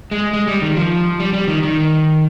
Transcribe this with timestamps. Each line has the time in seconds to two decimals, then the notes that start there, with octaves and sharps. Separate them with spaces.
0.11 G#3
0.33 G#3
0.48 G3
0.62 D#3
0.77 F3
1.20 G3
1.34 G3
1.48 D#3
1.63 D#3